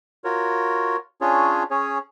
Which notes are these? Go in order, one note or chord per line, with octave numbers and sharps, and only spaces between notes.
F4 F#4 A#4 C#5
C#4 D4 F4 G#4 C#5
C#4 G#4 C#5